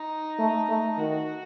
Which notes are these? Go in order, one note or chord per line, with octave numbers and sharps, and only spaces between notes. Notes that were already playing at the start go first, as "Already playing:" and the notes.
Already playing: D#4
A3
A3
D#3 F#4